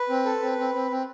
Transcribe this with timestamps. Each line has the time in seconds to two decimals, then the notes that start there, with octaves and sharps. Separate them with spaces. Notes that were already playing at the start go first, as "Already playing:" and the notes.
Already playing: B4
0.09 C4
0.25 A4
0.42 C4
0.58 C4
0.74 C4
0.91 C4